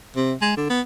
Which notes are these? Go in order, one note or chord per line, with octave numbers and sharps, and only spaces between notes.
C3
G#3
D3
B3